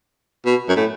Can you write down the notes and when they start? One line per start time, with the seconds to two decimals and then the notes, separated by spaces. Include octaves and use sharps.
0.46 B2
0.69 F#2
0.76 A2